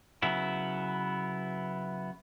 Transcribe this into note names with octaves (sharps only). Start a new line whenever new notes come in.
C#3 F#3 B3 E4